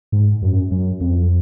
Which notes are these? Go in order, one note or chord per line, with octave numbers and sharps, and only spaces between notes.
G#2
F#2
F#2
F2